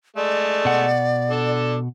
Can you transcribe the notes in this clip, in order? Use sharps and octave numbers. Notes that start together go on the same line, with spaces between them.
G#3 A3 D5
B2 F#5
D4 A4